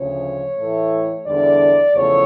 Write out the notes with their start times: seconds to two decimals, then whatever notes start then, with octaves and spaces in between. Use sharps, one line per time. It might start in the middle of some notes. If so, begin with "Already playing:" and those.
Already playing: D2 C#3 F3 C#5
0.58 A2 E3 A3
1.26 E2 D3 G3 D5
1.95 E2 C#3 F3 A3 C#5